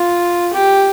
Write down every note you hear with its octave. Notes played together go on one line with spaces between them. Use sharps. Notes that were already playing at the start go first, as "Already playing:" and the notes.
Already playing: F4
G4